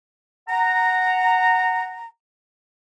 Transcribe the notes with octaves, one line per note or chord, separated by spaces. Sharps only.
F#5 A#5